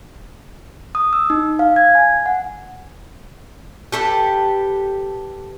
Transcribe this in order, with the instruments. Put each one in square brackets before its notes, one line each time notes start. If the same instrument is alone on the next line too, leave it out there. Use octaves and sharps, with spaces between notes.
[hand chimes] D#6
E6
D#4
F5
G#6
G#5
F#5
[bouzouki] G4 A4 B4